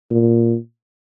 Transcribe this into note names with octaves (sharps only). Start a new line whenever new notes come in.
A#2